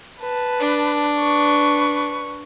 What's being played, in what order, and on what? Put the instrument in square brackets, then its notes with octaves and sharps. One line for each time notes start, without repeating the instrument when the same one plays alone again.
[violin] B4 A5
[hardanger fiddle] D4
[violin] B4 C#6